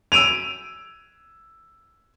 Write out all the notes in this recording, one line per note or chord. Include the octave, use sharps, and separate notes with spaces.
E6 D7 D#7 F7